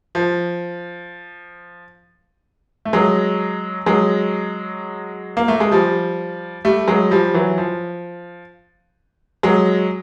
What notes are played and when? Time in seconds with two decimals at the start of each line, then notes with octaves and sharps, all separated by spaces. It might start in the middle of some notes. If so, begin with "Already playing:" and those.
0.15 F3
2.85 A3
2.93 F#3 G#3
3.86 F#3 G#3
5.37 A#3
5.48 A3
5.60 G#3
5.72 F3 G3
6.65 G3 A3
6.88 F#3 G#3
7.11 F3 G3
7.34 E3 F#3
7.58 F3
9.43 F#3 G#3